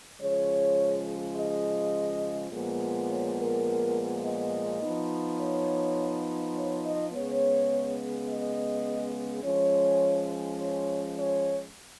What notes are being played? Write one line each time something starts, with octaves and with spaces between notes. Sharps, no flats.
C#3 F3 G#3 C#5
D#5
A#2 F3 G#3 B3
C#5
A#4
D#5
F3 B3 D#4
C#5
C#5
D#5
C#3 G#3 B3 C#5
D#5
F3 G#3 C#4 C#5
C#5
C#5